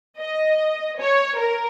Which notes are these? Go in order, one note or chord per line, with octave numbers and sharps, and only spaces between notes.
D#5
C#5
A#4